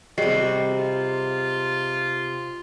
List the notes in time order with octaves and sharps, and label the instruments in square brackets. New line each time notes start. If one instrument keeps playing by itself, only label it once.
[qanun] C3 G3 [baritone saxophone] F#4 [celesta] G#4 D#5 C7
[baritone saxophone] F4